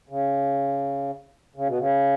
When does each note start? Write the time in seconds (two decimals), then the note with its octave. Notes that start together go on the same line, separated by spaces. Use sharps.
0.09 C#3
1.56 C#3
1.67 B2
1.78 C#3